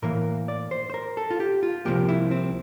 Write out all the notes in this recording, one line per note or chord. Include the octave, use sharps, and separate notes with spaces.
A2 E3 A#3 A#4
D5
C5
C5
A#4
A4
F4
G4
F4
C2 C3 F3 A#3 G4
E4
C4